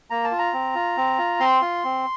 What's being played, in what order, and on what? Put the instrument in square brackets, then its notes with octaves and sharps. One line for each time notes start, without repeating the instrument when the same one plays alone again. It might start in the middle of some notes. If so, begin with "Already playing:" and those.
[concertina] A#3 A#5
A5
F4
A#5
C4
F4
C4
F4
C4 C6
F4
C4